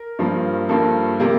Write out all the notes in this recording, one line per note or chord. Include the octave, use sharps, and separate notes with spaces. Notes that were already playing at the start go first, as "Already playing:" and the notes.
Already playing: A#4
G2 F3 A#3
G2 F3 A#3 A4
C3 G3 A#3